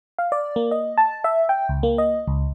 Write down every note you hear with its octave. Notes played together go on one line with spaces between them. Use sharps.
F5
D5
A#3
D#5
A5
E5
G5
C#2
A#3
D#5
C#2